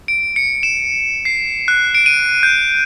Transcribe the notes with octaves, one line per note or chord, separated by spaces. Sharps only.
D7
C#7
E7
C7
F#6
D7
D#7
G6